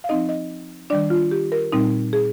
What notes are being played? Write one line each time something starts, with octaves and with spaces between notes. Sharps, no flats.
F5
F3 C4 D#4 D#5
D#5
D#3 G3 D4 D5
F4
G4
A#4
A#2 G3 C4 D#4
G#4